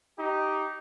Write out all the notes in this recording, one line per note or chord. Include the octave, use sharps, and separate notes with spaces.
D#4 G4